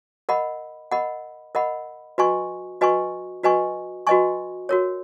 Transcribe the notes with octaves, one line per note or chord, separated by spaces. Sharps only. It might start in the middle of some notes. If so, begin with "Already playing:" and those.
A#4 D#5 F#5 B5
A#4 D#5 F#5 B5
A#4 D#5 F#5 B5
F#4 B4 D#5 G#5 C#6
F#4 B4 D#5 G#5 C#6
F#4 B4 D#5 G#5 C#6
F#4 B4 D#5 G#5 C#6
F#4 A#4 C#5